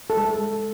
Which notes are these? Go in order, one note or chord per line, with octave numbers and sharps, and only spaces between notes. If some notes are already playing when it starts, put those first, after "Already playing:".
A4
G#3